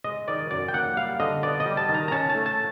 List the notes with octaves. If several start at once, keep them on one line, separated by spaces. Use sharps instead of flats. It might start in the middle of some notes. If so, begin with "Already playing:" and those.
G#3 D#5
D#3 D5
F#2 D5
G5
A#3 F#5
G3 F5
D3 D#5
B3 D5
D#5
G3
A5
D#3
A#5
A#5
C#4 A5
A5
A3
A5